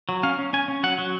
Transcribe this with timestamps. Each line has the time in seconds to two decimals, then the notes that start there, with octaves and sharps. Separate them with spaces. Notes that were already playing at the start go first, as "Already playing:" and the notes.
0.09 F#3
0.23 C#4 F5
0.39 C#4
0.53 C#4 G#5
0.68 C#4
0.83 F#3 F#5
0.98 F#3